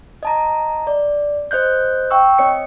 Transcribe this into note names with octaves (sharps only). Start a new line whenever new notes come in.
D#5 A5 A#5
D5
C5 D#5 F#6 G6
F5 G5 C#6 E6
C4 C#5 D#5 C#7